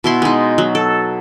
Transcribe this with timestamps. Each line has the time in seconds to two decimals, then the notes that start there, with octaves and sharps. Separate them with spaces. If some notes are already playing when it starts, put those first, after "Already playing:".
0.04 B2 E4 C6
0.22 G#3 D#4
0.58 F#3
0.75 A4